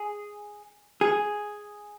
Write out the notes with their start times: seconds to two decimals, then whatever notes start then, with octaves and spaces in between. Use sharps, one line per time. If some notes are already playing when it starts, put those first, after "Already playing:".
Already playing: G#4
1.01 G#4